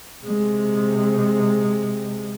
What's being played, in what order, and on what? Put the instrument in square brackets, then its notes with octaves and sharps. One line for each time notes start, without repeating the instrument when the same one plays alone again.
[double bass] C3 G#3